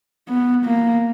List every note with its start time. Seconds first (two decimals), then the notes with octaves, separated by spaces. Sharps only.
0.29 B3
0.66 A#3